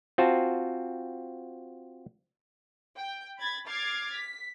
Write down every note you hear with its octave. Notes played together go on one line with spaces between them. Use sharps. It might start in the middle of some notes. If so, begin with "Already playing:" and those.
C4 F4 F#4 C5 A5
G5
B5 G#6 A6
D6 F6 G#6 A6 C7
B6